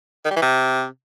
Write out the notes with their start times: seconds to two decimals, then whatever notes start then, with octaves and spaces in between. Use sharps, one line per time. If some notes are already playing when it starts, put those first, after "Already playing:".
0.25 D#3
0.31 G3
0.36 E3
0.42 C3